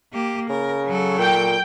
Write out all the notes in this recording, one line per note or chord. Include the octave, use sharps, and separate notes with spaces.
A#3 G4
C#3 A#4
F#3 A4
A#2 G5